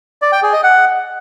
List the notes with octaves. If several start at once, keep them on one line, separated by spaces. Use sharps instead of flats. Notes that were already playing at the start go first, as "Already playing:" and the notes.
D5
G5
G#4
D#5
F#5